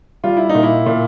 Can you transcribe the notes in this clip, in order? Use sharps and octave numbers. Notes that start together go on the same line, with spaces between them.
G3 F4
E4
D#4
A#2
E4
A#2